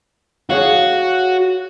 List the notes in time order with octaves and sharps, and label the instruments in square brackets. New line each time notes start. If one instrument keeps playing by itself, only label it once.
[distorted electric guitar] F#4 [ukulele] G#4 C#5 F5